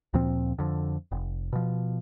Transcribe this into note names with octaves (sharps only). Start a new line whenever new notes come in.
D2 A#2 F3 C4
F2 D3
F1
B2 F3